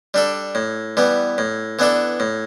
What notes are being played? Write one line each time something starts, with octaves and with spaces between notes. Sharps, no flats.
G3 D4 A4
A2
E3 G3 B3
A2
E3 B3 D4 A4
A2